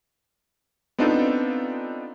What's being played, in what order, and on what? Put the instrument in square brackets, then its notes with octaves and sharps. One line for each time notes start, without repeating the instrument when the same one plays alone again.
[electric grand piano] B3 C4 D4 D#4 F4 A4